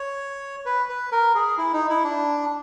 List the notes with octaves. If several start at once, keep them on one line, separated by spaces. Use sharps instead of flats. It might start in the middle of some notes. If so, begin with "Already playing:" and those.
Already playing: C#5
B4
B4
A#4
G#4
E4
D#4
E4
D4